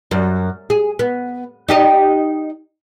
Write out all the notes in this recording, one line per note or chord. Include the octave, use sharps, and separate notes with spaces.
F#2
G#4
B3
D#4 G4 D#5